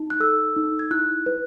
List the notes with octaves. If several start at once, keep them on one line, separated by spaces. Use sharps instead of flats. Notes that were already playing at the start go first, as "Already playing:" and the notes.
Already playing: D#4
F#6
A4 E6
D#4
G#6
E4 F#6
B4